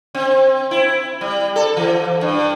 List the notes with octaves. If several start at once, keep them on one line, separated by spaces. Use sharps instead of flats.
C4
E4
G3
A4
E3
G2